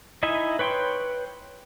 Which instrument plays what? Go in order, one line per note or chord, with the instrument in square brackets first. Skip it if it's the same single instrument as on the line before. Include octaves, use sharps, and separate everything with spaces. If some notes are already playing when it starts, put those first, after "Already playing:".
[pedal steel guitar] D#4 E4 D#5 E5 G#5
B4 C#5 G5 C6